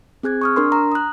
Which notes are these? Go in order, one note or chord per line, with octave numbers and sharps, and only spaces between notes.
C4 G#4 F#6 G#6
C#6 D#6 F6
D4 A#4 C6
A#5
D#6 F#6